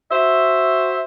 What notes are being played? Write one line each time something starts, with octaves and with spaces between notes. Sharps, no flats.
F#4 C5 E5